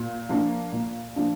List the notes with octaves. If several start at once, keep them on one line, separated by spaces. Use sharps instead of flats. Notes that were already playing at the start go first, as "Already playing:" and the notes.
Already playing: A#2
F3 A#3 D4
A#2
F3 A#3 D4